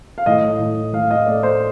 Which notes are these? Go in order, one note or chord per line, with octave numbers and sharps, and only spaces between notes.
F5
A2 D#5
A2
A2 F5
D#5
A3 D5
C5